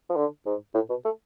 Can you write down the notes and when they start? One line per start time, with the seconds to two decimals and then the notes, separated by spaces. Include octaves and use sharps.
0.10 F3
0.17 D3
0.46 G#2
0.75 A2
0.90 B2
1.05 A3